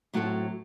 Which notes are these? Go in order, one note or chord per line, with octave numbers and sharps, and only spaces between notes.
A2 F#3 C4 F#4 A4